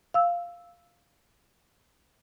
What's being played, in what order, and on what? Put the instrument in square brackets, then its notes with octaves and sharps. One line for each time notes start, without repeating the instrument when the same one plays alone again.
[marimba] F5 E6